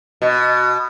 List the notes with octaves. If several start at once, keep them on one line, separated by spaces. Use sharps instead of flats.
B2